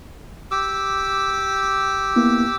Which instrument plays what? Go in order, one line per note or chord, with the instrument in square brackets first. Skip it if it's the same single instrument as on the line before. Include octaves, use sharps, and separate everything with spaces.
[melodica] G4 D6 E6
[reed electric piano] A#3 B3 E4